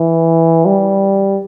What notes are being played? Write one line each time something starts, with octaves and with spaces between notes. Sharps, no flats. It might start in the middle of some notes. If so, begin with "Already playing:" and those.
Already playing: E3
G3